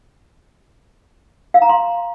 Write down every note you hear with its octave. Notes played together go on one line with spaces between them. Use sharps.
F5
A#5
C6